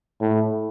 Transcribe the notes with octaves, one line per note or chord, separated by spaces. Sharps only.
A2